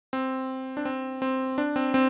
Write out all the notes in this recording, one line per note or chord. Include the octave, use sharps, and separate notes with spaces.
C4
D4
C4
C4
D4
C4
C4